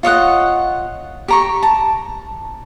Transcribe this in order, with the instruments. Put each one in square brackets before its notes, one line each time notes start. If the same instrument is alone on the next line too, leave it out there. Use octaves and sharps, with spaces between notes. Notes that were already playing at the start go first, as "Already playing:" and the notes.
[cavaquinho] F4 C#5 D#5 F#5
G4 A#5 C#6
A5 A#5